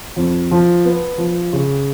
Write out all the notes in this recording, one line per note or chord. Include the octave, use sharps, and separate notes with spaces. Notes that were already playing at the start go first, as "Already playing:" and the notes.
F2
F3
B3
F3
C#3